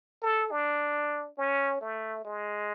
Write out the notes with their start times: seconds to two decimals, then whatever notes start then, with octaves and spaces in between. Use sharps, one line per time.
0.22 A4
0.51 D4
1.38 C#4
1.81 A3
2.25 G#3